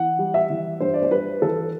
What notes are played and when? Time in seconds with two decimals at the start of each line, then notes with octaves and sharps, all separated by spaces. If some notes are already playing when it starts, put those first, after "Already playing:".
Already playing: E3 F#5
0.19 G3
0.34 E5
0.50 E3
0.81 G2 C5
0.94 D5
1.02 C5
1.11 G3 B4
1.42 E3 A4